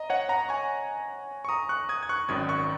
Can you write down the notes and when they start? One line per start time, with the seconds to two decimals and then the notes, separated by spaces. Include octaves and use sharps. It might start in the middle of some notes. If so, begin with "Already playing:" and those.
Already playing: D#5 A#5
0.10 C#5 F#5
0.29 F#5 A#5
0.49 G#5 C#6
1.45 C#6
1.49 A#5 D#6
1.69 C#6 F#6
1.89 D#6 G#6
2.03 G#6
2.09 C#6 F#6
2.28 G#1 F#2 D#3 D#6 G#6
2.49 C#6 F#6